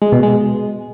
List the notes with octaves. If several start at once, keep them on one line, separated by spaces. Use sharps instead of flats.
G#3
B2
G#3